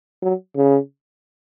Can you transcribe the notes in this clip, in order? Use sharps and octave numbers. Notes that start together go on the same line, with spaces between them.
F#3
C#3